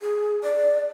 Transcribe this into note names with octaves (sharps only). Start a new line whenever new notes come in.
G#4
D5